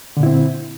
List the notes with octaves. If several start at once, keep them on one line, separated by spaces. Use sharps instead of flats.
A#2 D3 C4 E4